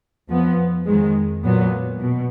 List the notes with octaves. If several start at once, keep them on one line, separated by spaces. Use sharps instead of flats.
F2 F3 B3
F2 D#3 G#3
A#2 F#3 B3
B2